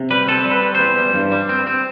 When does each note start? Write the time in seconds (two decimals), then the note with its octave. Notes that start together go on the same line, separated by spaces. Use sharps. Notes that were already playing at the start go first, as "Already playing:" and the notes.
Already playing: C3
0.10 G3 B4
0.27 C4 A4
0.45 G3
0.51 B4
0.63 C4
0.75 E2 C5
0.98 G3
1.14 G2
1.32 G3
1.49 C4
1.67 C4